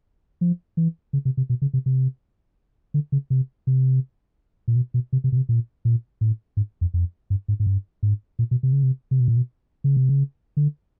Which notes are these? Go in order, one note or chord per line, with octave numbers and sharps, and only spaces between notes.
F3
E3
C#3
C3
C3
B2
C#3
C3
C3
D3
C#3
C3
C3
A#2
B2
B2
C3
C3
B2
C3
A#2
A#2
A2
G#2
F2
F2
G2
G#2
G#2
G2
G#2
A#2
B2
C3
C#3
C3
C3
B2
A#2
B2
C#3
C3
C#3
D3